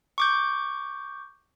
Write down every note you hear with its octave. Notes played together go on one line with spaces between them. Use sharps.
C#6 D6 G6